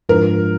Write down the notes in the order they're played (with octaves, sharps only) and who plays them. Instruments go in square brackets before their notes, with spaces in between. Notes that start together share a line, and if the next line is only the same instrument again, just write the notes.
[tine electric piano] G#2 F3 G#3 D4 F4 [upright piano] A#4